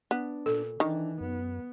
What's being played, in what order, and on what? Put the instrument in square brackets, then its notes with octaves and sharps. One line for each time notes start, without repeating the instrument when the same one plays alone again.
[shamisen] B3 [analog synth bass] D4
[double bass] A#2 [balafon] A4
[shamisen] D#3 [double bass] E3 [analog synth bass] D4
[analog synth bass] F#2 [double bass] B3